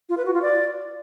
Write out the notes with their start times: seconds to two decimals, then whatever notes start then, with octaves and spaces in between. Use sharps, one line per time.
0.09 F4
0.17 B4
0.26 F#4
0.34 F4
0.42 D5